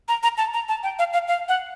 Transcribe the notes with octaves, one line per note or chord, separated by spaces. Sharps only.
A#5
A#5
A5
A#5
A5
G5
F5
F5
F5
F#5